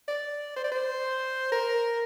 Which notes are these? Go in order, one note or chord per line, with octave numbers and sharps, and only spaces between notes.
D5
C5
D5
C5
A#4